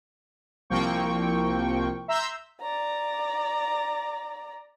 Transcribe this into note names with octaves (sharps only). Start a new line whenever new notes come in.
C2 F3 A#3 C4 G5 C#6
E5 A#5 C6 E6 G6
D5 A#5